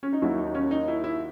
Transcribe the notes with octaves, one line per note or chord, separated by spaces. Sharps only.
C#4
D#4
D#2 D#3 F#3 E4
D#4
C#4
D#4
E4
E4